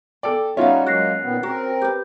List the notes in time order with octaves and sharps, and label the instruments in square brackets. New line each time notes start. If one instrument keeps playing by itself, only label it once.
[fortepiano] A4 D5 [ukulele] G5
[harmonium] G3 D#4 F#4 [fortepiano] C#4 F4 [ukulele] E5 F5
[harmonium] F#3 G#3 A#3 [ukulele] F#4 [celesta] F#6 A#6 C7
[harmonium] A#2 D#3 B3
[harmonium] C4 A#4 [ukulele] F#4
[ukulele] G4 B4 [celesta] G6